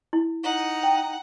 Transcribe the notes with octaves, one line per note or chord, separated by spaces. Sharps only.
E4
D#4 F#5
G5